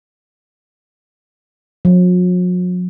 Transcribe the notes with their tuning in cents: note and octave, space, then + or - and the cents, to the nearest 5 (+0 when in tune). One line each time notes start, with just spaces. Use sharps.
F#3 -45